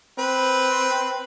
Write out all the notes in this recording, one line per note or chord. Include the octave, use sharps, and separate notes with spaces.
C4 B4